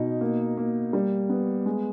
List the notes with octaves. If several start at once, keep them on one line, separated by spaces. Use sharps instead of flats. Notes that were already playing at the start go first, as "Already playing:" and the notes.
Already playing: B2 D#4
A#3
A#3
G3
B3
G#3